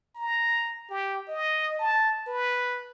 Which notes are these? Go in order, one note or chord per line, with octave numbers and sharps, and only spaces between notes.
A#5
G4
D#5
A5
B4